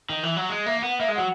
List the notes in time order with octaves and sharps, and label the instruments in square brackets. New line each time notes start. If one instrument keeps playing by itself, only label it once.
[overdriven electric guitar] D#3
E3
F#3
G#3
[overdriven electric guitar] A#3 [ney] E5
[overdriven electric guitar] B3 [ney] F#5
[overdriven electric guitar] A#3 [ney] E5
[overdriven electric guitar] G#3
[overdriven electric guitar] F#3 [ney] F#5